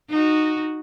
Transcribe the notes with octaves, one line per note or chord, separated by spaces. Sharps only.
D#4 F#4